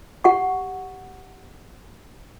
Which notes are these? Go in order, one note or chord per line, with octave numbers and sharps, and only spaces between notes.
G4 F#5 C#6